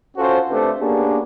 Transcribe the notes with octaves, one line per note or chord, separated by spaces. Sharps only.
C#4 F4 F#4 A4 C5
C3 A3 D4 A4 B4 C5
A#3 B3 C#4 D4 G4 G#4